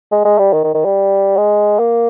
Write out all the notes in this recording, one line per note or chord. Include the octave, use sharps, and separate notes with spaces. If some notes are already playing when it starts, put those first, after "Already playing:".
G#3
G#3
G3
D#3
D#3
D#3
G3
G#3
A#3